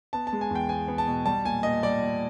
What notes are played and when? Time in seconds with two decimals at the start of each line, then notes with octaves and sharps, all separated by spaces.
0.13 B3 A5
0.27 A5
0.33 G#3
0.41 G#5
0.51 E2 G5
0.69 B3 G#5
0.88 B3
0.98 A5
1.07 B2
1.25 G3 A5
1.45 A#2 G#5
1.63 A#2 D#5
1.83 G3 D5
2.02 A#2